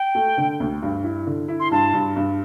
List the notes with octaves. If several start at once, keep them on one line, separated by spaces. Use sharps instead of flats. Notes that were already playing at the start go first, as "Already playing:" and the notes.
Already playing: G5
A3
D3
D2
G2
E4
D3
E4
C6
G2 A5
G2
G2